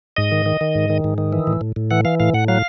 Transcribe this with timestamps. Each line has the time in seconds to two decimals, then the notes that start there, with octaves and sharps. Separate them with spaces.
0.17 G#2 D#5
0.32 D#3
0.46 D#3
0.61 D#3
0.75 G#2
0.90 D#3
1.04 G#2
1.18 D#3
1.33 E3
1.47 A2
1.61 A2
1.76 A2
1.91 E3 F#5
2.05 E3 F5
2.20 A2 F5
2.34 A2 F#5
2.48 F#3 F5